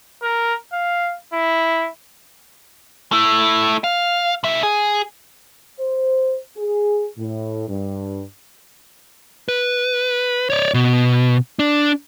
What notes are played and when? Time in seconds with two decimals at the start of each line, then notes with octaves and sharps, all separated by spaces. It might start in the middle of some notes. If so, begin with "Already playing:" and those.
0.22 A#4
0.73 F5
1.33 E4
3.12 A3 E4
3.84 F5
4.44 B2 E5
4.63 G#4
5.80 C5
6.57 G#4
7.18 A2
7.69 G2
9.48 B4
10.50 C#5 D5
10.74 B2
11.59 D4